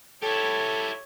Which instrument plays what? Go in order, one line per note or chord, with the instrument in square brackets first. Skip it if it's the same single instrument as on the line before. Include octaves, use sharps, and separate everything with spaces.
[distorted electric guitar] E4 G4 [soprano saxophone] A4 [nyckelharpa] C#5